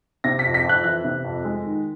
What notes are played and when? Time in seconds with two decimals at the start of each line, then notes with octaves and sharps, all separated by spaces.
0.24 C3 A#6
0.39 B6
0.44 F2
0.54 B6
0.64 F2 F#6
0.84 E3 F#6
1.04 C3
1.25 F2
1.45 G#3
1.65 D#3